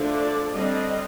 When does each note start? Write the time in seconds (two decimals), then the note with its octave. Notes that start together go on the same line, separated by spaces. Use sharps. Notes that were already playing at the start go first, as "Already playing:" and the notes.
Already playing: D3 F3 A3 D4
0.19 D5
0.52 D3 G3 C4 D#5